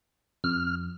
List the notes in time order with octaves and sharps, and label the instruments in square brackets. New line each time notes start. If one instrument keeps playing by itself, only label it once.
[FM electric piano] F2 [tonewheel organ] F6